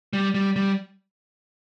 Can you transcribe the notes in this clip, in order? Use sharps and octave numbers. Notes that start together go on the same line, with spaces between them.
G3
G3
G3